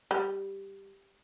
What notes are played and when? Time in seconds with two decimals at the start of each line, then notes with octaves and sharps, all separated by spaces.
0.11 G3